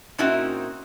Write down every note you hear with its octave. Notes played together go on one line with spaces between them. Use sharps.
A#2 C4 C#4 D#4 E4 F#4